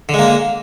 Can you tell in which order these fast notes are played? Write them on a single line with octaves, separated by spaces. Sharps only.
D3 G#3 A#3